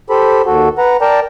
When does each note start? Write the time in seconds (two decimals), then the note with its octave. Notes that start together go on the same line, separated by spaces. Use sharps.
0.10 G4 A4 C5 B5
0.46 D#2 F#4 A4
0.78 B4 F#5 A#5
1.01 A#4 D5 G5 A5 A#5